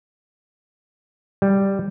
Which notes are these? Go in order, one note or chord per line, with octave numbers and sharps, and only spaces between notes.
G3